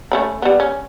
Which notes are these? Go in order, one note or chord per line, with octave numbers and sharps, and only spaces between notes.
A3 C#4 B5
G3 B3
C#4